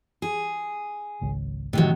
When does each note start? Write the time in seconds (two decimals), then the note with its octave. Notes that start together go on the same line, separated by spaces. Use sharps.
0.22 G#4
1.21 G#1 C#2
1.73 A2 C3 D#3 F#3